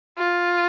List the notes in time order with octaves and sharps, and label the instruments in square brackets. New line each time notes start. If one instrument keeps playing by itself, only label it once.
[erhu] F4